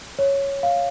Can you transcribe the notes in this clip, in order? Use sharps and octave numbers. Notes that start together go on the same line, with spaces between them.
C#5
F5